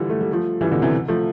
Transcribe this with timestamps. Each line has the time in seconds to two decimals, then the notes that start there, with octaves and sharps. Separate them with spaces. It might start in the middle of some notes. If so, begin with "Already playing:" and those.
Already playing: D3 E3 F3 G3
0.09 A3
0.21 G3
0.32 F3 A3
0.61 E3 G3
0.71 B2 D3
0.82 C3 E3
1.08 F3 A3